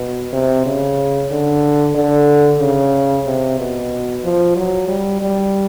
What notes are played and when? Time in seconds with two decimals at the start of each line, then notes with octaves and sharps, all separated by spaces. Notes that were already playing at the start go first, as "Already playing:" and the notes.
Already playing: B2
0.33 C3
0.66 C#3
1.31 D3
1.95 D3
2.60 C#3
3.26 C3
3.59 B2
4.24 F3
4.56 F#3
4.88 G3
5.21 G3